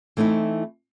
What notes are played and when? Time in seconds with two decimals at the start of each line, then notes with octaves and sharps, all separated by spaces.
0.17 E3 A3 C4 D#4 E4